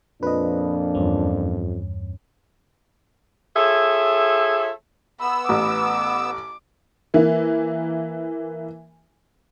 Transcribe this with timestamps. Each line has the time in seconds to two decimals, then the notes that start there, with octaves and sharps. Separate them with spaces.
0.23 F2 A#2 F3 D4 B4 D#5
0.95 E2 G2 C#4
3.56 F4 G#4 A4 C#5 E5
5.21 B3 B5 E6
5.49 A1 D6
7.14 E3 A#3